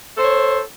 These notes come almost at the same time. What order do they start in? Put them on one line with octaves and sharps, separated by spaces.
A4 C5 C#5